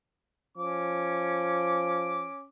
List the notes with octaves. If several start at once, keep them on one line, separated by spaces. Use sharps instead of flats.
F3 C#4 D6